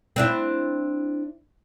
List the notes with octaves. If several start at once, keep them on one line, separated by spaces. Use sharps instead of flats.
C4 D4 E4